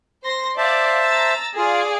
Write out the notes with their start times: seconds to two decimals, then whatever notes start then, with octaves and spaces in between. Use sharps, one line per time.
0.24 C5 C6 A#6
0.58 C5 D5 E5 F5 A5
1.05 A#5 E6 A6
1.58 F4 G#4 D5 F5